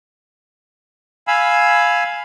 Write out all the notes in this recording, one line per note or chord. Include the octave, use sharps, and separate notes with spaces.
F5 G#5 B5 E6